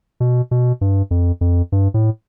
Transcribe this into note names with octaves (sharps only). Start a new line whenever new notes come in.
B2
B2
G2
F2
F2
G2
A2